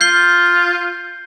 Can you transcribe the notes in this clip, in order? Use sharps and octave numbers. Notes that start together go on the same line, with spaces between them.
F4 G6 C7 G7